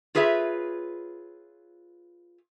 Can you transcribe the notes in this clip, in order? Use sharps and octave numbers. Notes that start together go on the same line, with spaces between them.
F4 G#4 B4 C#5 E5